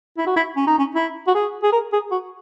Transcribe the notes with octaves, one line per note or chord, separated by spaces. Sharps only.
E4
F#4
E4
C#4
D#4
C#4
E4
F#4
G#4
G#4
A#4
G#4
F#4